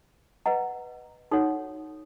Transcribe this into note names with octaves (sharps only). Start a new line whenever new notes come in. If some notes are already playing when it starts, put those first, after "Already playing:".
B4 D#5 F#5 A#5
D#4 F#4 A4 C#5 F#5